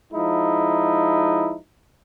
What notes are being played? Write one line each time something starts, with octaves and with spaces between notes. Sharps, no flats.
F3 G#3 D#4 E4